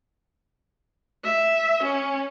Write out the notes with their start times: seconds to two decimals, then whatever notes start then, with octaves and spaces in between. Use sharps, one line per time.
1.24 E5
1.84 C#4